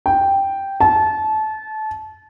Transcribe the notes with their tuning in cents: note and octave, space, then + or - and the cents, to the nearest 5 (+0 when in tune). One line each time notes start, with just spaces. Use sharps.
G5 +0
A5 -25